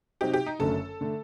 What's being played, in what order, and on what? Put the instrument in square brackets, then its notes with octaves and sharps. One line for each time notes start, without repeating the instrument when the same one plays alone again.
[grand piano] C3 F#3 C4 D#4 F#4 [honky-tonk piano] G4
[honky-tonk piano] G4
D#4
[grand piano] F#1 F#2 D3 A3 [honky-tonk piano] A4
[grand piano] D3 A3